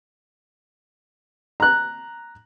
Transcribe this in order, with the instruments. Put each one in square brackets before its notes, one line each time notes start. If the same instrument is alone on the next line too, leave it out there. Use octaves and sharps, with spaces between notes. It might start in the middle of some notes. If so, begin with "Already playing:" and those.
[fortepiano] A#5 F#6